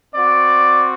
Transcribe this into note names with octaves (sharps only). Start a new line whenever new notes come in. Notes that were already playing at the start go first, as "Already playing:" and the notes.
C4 F#4 D5